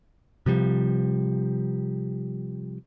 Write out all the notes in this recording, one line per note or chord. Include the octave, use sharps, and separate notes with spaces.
C3 F3 G3